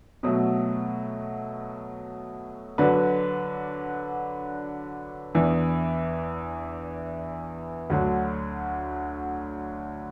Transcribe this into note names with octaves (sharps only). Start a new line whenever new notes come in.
B2 F#3 A3
D3 F#3 D4 B4
E2 E3 D4
D2 D3 F#3